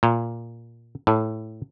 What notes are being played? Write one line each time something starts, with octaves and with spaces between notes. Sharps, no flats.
A#2
A2